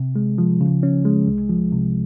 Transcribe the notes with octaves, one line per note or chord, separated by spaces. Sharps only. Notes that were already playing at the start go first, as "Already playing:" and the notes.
Already playing: C3
G#3
F3
C#3
C#4
G#3
C2
F3
C3